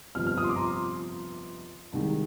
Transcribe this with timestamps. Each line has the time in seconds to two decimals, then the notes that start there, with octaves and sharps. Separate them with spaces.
0.15 G1 F2 C3 F6
0.27 F6
0.38 D#6
0.44 C6
0.49 D6
0.56 A#5
0.60 C6
1.93 C2 C3 D#3 G#3